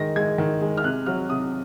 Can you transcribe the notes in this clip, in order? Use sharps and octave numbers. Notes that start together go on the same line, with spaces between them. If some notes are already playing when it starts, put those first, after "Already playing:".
Already playing: D#3 G#3 A#6
G#3 G#6
D#3
G#3
F6
C3 F#6
F#3 F6
C3 D#6